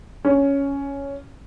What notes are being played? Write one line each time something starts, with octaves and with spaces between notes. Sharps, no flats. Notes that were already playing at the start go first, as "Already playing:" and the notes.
C#4